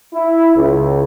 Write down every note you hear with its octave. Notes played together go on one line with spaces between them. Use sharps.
E4
C#2